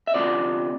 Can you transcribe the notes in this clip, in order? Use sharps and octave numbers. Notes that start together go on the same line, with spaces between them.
E5
D2 C3 F3 D5